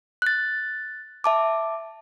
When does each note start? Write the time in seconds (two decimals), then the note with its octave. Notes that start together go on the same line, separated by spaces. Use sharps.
0.22 F#6 A6
1.24 E5 A5 D6